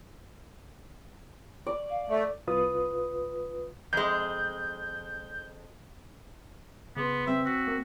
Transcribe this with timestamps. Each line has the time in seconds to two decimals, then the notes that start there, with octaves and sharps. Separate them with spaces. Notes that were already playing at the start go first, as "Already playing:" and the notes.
1.67 D5
1.90 F5
2.09 A3 D5
2.47 C2 F4 B4 D#6
3.93 F2 G#3 G6
6.96 C#3 B3 G#4 B4 C6
7.27 C4 E5
7.46 F#4 E6 B6
7.68 A#3